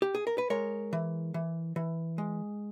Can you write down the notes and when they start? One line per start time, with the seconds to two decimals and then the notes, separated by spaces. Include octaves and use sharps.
0.02 G4
0.15 G#4
0.27 A#4
0.38 B4
0.50 G#3 A#4 C#5
0.93 E3
1.34 E3
1.76 E3
2.18 G#3